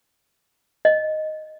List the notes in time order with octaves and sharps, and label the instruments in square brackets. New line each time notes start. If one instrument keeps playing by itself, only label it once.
[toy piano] D#5